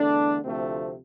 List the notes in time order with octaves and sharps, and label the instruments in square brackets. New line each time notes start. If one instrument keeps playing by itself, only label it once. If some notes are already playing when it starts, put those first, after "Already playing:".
Already playing: [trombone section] E2 D3 A3 D4
D2 C3 F3 A3 C4